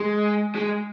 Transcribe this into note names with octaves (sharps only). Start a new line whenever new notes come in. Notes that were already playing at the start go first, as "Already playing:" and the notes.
Already playing: G#3
G#3